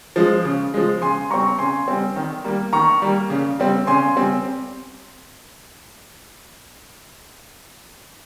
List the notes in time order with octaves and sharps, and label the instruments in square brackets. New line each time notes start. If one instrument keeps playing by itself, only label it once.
[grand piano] F3 G#3
C#3
F3 G#3
C#3 G#5 C6
G3 C4 A#5 C#6
C#3 G#5 C6
G3 C4
D#3
G3 A#3
D#3 A#5 C#6
G3 A#3
C#3
G3 C4
C#3 G#5 C6
G3 C4